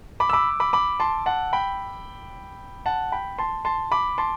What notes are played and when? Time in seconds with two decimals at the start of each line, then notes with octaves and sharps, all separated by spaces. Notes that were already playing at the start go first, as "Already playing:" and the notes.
0.20 B5 D6
0.29 E6
0.33 B5 D6
0.60 B5 D6
0.73 B5 D6
1.00 A5 C6
1.26 F#5 A5
1.53 G5 B5
2.86 F#5 A5
3.12 G5 B5
3.39 A5 C6
3.65 A5 C6
3.92 B5 D6
4.18 A5 C6